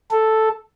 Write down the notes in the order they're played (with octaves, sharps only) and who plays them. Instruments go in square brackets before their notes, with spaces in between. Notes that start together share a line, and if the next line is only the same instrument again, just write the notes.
[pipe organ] A4